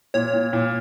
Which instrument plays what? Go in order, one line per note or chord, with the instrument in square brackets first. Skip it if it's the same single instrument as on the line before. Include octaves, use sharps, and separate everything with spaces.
[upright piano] A#2 [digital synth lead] C#5
[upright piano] A#2
A#2